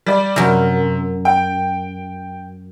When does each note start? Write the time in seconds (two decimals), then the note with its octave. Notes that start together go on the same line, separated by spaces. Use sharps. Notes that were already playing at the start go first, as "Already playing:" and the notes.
0.06 G3 D5
0.36 F#2 C3 A#4
1.25 G5